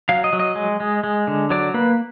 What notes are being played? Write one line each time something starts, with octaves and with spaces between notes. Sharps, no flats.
F#3 F5
D#5
F#3
D#5
G#3
G#3
G#3
D3
F#3 D5
A#3 B4